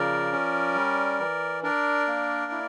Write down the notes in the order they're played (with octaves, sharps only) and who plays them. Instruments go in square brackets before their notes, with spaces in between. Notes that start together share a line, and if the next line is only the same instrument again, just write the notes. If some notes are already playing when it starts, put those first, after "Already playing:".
Already playing: [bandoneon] C#3 F3 A#4 D5
C#4
G3
E3
D4 A#4 D5
A#3
E4